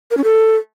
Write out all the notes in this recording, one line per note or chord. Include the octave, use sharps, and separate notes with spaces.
A#4
C#4
A4